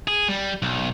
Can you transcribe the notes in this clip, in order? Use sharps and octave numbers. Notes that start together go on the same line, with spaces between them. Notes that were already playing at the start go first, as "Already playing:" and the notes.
G#4
G3
B1